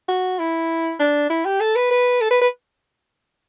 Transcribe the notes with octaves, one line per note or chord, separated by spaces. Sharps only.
F#4
E4
D4
E4
G4
A4
B4
B4
A4
B4
B4